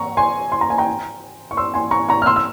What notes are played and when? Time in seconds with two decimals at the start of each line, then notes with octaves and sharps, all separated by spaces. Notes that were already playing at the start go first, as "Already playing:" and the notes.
Already playing: A#5 C#6
0.17 G#5 C6
0.52 C6
0.61 A#5
0.70 G#5
0.78 G5 A#5
1.51 C#6
1.57 C6 E6
1.74 G#5 C6
1.91 A#5 C#6
2.09 A#5 C#6
2.22 F6
2.26 C6 E6
2.36 E6